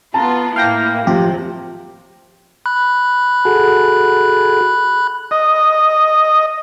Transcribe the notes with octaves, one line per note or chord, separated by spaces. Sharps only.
B3 F4 A5 A#5
A2 A#3 E4 F5 G5 A#6
C#2 F#2 C3 F3 G4
B5 F#6
F#4 G#4 A4
D#5